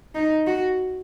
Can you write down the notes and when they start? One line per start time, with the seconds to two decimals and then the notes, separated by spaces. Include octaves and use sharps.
0.15 D#4
0.47 F#4